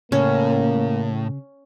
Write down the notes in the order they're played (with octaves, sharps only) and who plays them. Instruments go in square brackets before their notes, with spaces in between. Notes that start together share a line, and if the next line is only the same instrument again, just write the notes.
[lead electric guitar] A2 [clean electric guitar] C#3 [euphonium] A#3 [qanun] C#4